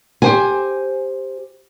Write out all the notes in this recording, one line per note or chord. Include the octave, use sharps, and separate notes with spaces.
G4 C5 G#5